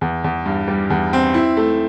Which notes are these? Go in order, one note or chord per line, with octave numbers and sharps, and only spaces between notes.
E2
E2
G2
G3
E2
C4
E4
A3